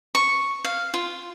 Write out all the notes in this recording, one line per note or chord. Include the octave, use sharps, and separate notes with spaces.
C#6
F5
F4